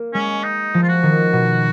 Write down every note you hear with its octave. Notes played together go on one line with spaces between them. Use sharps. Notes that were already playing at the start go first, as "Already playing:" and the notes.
Already playing: A#3
G#3 C#4
D#4
F3
F4
F#4
D#3
B2